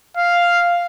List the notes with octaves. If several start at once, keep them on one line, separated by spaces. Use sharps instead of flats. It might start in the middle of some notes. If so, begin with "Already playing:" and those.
F5